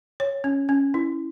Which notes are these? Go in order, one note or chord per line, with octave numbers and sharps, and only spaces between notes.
C#5
C#4
C#4
E4